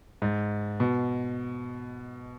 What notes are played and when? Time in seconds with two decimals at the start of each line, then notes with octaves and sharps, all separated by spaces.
0.22 G#2
0.80 B2